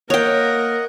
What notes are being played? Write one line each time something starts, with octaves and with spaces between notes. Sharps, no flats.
A#3 A#4 C#5 D#5 F#5 G5